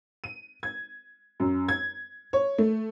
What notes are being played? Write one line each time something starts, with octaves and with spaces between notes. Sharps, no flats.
D#7
G#6
F#2
G#6
C#5
A3